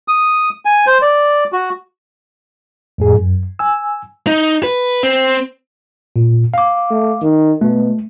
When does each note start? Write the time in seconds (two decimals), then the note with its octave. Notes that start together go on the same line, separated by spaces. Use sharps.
0.08 D#6
0.65 G#5
0.87 C5
1.02 D5
1.52 F#4
2.98 F2 A2 G#4
3.15 F#2
3.59 G#5 E6
4.27 D#4
4.63 B4
5.03 C4
6.16 A#2
6.54 F5 D6
6.91 A3
7.22 D#3
7.61 B2 A3